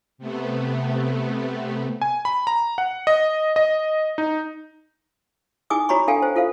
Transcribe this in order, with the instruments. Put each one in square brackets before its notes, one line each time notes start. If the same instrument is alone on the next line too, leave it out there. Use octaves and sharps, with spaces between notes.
[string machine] C3 A3 B3
[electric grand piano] G#5
B5
A#5
F#5
D#5
D#5
D#4
[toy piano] D#4 G#4 G#5 D6 D#6
F#4 C#5 A#5 B5 C#6
D4 A4 F5 G5 G#5
C5
F4 A4 C5 F5